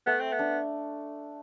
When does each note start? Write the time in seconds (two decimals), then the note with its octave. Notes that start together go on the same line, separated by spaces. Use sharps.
0.06 A3 B3
0.20 C4
0.32 B3
0.39 D4